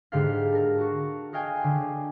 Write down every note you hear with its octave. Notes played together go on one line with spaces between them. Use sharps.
G#2 D3 G4 A4 F5
A4 A#4
F#4 A5 C#6
F#4 D#5 F5 G5 G#5
D3